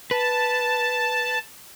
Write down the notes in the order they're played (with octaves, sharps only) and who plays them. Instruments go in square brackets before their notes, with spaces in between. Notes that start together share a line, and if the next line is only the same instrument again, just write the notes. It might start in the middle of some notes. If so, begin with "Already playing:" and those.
[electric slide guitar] B4 [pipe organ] A5